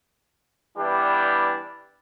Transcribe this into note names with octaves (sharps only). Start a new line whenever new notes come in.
E3 G3 B3 D4 E4 G4